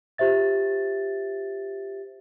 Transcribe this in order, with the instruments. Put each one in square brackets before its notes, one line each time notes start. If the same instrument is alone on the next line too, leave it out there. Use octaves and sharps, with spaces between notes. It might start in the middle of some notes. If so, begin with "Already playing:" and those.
[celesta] F4 G4 C5 E5 A6